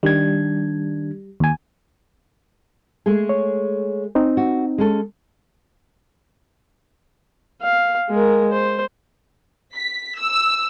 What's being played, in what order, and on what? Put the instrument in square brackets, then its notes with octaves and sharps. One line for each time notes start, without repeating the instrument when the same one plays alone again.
[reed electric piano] D#3 D4 G#6 [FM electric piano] G3
[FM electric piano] D#2 G#5
[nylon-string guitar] G#3 A3 G#4
[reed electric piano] C#5
C4 D#4
[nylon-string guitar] F#4
G#3 C#4 A4
[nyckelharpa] F5
G#3 A#4
C5
[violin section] B6
E6